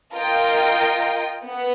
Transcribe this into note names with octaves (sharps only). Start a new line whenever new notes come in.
F4 A#4 D#5 G5
B3